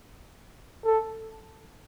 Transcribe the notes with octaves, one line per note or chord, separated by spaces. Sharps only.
A4